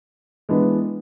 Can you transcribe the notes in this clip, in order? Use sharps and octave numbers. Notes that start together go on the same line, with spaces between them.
E3 G#3 B3 D4